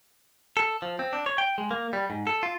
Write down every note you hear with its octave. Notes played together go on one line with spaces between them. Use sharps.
A4
F3
C4
D4
C#5
G5
G#3
A#3
G3
G#2
A4
F4